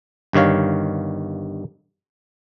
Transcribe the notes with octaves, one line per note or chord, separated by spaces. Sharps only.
G1 G2 D#3 C#5 F5